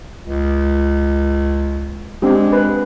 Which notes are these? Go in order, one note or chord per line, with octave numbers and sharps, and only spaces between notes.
C#2
G#3 C4 D4 G4
B4